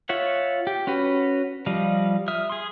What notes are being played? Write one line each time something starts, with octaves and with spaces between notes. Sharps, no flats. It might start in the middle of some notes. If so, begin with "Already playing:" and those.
F4 C#5 E5 F#5
G4
C#4 F#4 B4
F3 G3 D#5 F5
E5 D#6 F6
G#4 C6